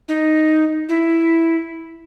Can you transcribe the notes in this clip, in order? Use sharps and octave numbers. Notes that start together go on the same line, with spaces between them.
D#4
E4